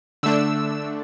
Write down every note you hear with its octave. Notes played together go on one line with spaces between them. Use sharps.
D3 A3 D4 E6